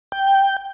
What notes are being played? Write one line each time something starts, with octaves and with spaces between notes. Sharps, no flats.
G5